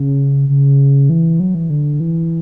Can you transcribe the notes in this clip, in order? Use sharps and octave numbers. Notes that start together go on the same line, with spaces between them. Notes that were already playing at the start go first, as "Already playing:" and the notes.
Already playing: C#3
C#3
E3
F#3
E3
D3
E3